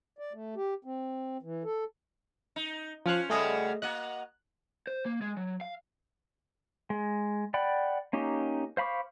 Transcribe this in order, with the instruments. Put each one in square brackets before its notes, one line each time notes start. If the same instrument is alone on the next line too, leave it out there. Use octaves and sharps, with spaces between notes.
[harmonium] D5
A3
G4
C4
E3
A4
[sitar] D#4
[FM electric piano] F3 F6 F#6 [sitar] C#4 C5
[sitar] C#3 G3 F#4 [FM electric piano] A3 G#4 D#5
[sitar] A#3 F#4 D#5 [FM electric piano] F#6
[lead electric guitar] C5
A#3
G#3
F#3
F5
[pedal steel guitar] G#3
D5 F#5 G5 B5
A#3 C#4 D#4 G4
C5 F5 B5 C#6 D6